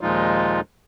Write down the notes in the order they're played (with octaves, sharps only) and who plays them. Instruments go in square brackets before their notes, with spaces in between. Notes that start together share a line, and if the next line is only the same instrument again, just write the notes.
[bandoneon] D#2 A#2 F3 G#3 D#4 F4